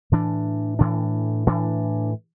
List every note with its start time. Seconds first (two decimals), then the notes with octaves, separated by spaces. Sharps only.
0.12 A2 E3 D4
0.79 A2 E3 D4
1.47 A2 E3 D4